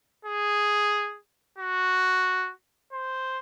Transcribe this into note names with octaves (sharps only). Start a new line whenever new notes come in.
G#4
F#4
C5